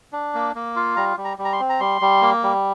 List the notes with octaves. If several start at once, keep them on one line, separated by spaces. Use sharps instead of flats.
D4
A#3
A#3
F4
G3 A#5
G3
A#5
G3
A#5
C6
C4
A#5
G3 C6
G3
A#3
G3